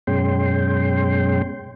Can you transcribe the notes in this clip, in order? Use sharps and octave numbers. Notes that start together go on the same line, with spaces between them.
F#2 B2 G#3 C#4 G5 C6